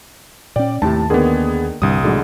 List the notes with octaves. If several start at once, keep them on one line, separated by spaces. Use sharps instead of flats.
A#2 C#4 D5 G5
D#2 A2 C3 A5
D3 D#3 A#3 B3 G#4
C2 G2 D3 D#6
A2 D3 F#3 G#3